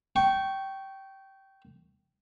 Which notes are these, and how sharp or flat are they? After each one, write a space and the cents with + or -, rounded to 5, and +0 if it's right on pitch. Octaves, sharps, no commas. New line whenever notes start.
G5 -15 C#6 +0